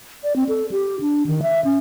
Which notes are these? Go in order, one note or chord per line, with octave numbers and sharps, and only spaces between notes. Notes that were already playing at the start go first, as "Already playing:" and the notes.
D5
C4
A4
G4
D4
D#3
E5
C#4